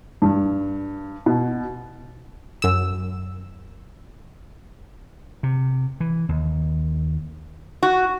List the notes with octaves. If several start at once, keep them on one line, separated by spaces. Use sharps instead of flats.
G2
B2
F#2 E6
C3
E3
D#2
F#4